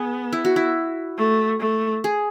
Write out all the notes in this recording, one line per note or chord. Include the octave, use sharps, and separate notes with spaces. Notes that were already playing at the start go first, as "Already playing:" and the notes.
Already playing: B3 G#4
E4
F#4
E4
A3
A3
G#4